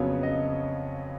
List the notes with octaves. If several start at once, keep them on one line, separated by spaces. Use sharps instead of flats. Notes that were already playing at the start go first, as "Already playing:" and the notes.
Already playing: F2 C#3 F#3 B3 C#5
D#5